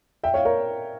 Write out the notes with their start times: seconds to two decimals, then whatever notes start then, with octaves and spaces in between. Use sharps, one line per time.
0.23 E5 G5
0.34 C#5 F5
0.45 A#4 C#5